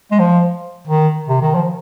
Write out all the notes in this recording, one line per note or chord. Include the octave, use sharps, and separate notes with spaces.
G#3
F3
D#3
C3
D#3
F3